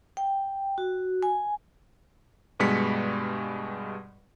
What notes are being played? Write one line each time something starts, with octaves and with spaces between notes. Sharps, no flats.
G5
F#4
G#5
G2 B2 G3 G#3 B6 C#7